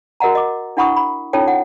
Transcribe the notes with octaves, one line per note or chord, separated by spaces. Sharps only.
F#4 A#4 D#5 F#5 A#5
D#5 D6
D4 E4 F#5 B5 C#6 D#6
B5
C#4 D#4 F4 A4 C#5 G5
F#5